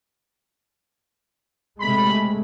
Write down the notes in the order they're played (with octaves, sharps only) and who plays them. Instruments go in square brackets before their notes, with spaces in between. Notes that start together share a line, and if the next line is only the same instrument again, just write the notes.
[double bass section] C3 G#3 A3 [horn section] B5